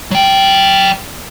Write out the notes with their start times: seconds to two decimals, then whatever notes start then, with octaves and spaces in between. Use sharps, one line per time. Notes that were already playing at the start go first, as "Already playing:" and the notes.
0.11 F#3 G5